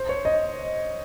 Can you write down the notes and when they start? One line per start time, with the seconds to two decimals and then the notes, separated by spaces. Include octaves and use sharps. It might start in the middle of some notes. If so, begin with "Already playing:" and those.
Already playing: C5
0.09 C#5
0.25 D#5